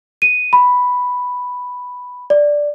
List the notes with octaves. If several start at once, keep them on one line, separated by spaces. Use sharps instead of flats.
D#7
B5
D5